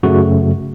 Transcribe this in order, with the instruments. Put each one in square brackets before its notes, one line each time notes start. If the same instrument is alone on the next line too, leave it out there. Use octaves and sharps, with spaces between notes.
[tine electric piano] F#2 C#3 F#3 A3 F#4